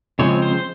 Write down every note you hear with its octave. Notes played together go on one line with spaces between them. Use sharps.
C#3 F3 G#3 C4 C#5
C5